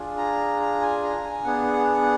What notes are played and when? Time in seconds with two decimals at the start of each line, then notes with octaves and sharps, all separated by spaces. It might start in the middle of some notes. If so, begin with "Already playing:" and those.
Already playing: D4 F4 G#4
0.17 A#5
0.60 A#5
0.81 G#5
1.03 A#5
1.24 G#5
1.44 B3 D4 G#4 F#5
1.73 F#5
2.01 F#5